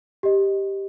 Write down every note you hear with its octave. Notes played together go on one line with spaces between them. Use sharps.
G4 D#5